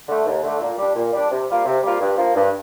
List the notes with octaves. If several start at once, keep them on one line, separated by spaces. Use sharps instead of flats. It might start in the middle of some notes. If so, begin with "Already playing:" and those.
D3 A3
D#2
D3 A3
A#2
G3 D4
A#2
G3 D4
C3
G3 A#3 F4
C3
G3 A#3 F4
G2
F3 A#3
G2